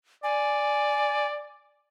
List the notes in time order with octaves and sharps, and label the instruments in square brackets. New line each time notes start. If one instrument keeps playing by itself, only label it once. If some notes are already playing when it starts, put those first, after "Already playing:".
[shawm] D5 [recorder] G#5